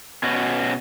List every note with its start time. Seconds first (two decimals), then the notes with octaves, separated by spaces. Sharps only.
0.23 B2 C#4 F#4